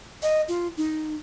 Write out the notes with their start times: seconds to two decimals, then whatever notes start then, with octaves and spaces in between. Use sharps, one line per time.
0.22 D#5
0.48 F4
0.77 D#4